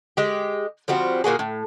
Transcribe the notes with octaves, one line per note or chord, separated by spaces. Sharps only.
G#3 G4
F3 G3 C4 F#4
A#2 A#3 F#4 G#4
A2